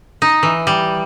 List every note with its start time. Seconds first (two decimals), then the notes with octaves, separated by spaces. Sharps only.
0.22 D#4
0.43 E3
0.67 G3